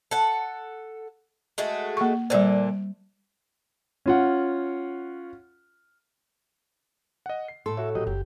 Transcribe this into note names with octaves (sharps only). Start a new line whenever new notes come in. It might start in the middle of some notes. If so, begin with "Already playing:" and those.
A4 F#5
G#3 A3 F#4
A#3 C#6
A#2 D3 G3 C5
C#4 F4 F#5
D#5 F#5
C7
A2 A4 C6
F#4 C#5 E5
A#2 F#3 F#4 G4 D#5
F#1 G4